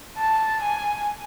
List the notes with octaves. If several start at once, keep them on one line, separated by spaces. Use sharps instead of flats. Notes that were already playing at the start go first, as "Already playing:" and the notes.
A5
G#5